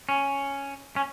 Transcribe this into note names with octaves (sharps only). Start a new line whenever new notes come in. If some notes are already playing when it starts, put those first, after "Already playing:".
C#4
C#4